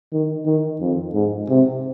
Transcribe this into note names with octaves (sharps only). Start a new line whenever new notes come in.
D#3
D#3
F2
G#2
C3